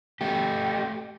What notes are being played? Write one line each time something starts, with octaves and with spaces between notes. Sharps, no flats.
A3 G4